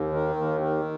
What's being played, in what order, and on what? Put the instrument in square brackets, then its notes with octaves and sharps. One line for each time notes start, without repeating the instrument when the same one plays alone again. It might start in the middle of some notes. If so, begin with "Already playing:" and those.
Already playing: [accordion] D#2
D#3
D#2
D#3